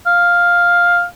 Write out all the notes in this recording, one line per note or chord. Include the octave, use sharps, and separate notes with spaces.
F5